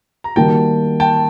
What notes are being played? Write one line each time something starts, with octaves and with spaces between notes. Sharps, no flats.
A#5
D#3 G3 A#3 D#4 F#4 G5 A5
G5 A5